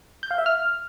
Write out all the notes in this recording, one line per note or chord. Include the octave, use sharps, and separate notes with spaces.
G6
F5
E5
F6